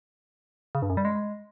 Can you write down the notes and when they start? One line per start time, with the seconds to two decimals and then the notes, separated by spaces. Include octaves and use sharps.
0.75 C#3
0.82 G2
0.90 F#2
0.97 G3
1.05 G#3